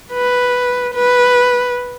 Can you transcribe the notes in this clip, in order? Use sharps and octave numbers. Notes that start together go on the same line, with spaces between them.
B4
B4